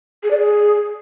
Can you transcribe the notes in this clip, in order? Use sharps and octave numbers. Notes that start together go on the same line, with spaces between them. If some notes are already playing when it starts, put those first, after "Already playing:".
G#4
D5
G#4